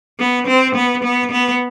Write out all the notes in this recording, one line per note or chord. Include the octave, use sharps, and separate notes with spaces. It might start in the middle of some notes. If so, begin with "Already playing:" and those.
B3
C4
B3
B3
B3